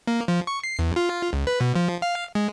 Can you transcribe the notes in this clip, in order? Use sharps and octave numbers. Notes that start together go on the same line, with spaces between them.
A#3
F3
C#6
C7
E2
F4
C#2
B4
B2
F3
F5
G#3